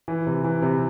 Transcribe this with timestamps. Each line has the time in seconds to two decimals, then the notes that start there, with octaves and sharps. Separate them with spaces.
0.08 E3
0.27 C3
0.44 E3
0.62 C3